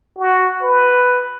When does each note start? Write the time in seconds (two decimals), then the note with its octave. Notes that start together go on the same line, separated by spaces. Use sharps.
0.18 F#4
0.63 B4